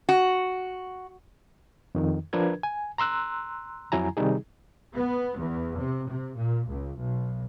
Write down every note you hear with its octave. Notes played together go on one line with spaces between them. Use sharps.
F#4
F2 D#3
F3 D4 A#4 B4 G#6
G#5
A#5 C6 E6 F#6
F2 F#3 E4 G#5 A#5
C3 D#3 G3 D#4 G#4
B3
E2
C3
C3
A#2
C#2
B1